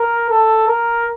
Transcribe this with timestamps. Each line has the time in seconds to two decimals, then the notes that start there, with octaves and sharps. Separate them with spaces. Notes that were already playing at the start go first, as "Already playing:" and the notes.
Already playing: A#4
0.30 A4
0.68 A#4